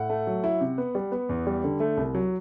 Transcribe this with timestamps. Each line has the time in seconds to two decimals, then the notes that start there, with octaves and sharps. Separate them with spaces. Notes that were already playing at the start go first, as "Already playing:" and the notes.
Already playing: A2 F#5
0.10 A3
0.27 F#3
0.44 E4
0.61 C3
0.78 B3
0.95 G3
1.12 B3
1.29 E2
1.47 G3
1.64 D3
1.80 A3
1.97 C2
2.15 F#3